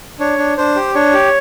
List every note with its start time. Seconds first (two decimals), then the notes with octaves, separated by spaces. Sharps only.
0.20 D4 C#5
0.38 D4
0.57 D4 C5
0.76 G4
0.94 D4 C#5
1.14 G4